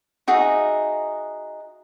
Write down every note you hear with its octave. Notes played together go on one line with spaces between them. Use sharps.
D#4 F#4 G#4 E5